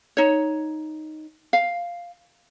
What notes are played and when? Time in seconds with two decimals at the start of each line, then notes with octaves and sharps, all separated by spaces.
0.17 D#4 C#5
1.53 F5